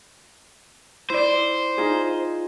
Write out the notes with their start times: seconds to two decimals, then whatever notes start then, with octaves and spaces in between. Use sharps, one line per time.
1.10 E4 C5 D5
1.78 D#4 F4 G#4